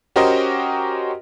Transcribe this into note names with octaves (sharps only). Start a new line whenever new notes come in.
C#4 F#4 G4 A#4 C5 D#5